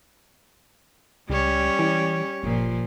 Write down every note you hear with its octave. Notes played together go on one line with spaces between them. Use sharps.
C#2 G3 C#4 C#5
E3
G1 A#2 F3